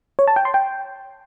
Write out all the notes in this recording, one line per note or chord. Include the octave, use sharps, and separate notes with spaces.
C#5
A5
G5
C6
G5